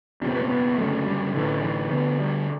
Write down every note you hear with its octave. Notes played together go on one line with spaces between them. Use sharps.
F#1 E2 B2 D4
C4
B3
C4
B3
F#1 F#2 D3 A3
G3
A1 G2 D3 E3
E3
D2 D3 B3
G3